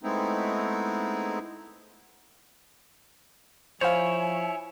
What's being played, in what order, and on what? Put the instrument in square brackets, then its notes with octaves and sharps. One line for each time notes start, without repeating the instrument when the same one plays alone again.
[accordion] G#3 A3 B3 C4 D#4 E4
[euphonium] F3 [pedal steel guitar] E4 C#5 [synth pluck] C5 F5 [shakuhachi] G#5